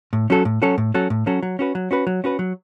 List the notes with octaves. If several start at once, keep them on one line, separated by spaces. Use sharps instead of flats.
A2
F#3 C#4 F#4 A4
A2
F#3 C#4 F#4 A4
A2
F#3 C#4 F#4 A4
A2
F#3 C#4 F#4 A4
F#3
C#4 F#4 B4
F#3
C#4 F#4 B4
F#3
C#4 F#4 B4
F#3